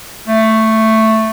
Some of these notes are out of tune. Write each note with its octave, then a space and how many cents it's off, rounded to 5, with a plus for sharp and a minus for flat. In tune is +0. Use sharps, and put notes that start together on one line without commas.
A3 +5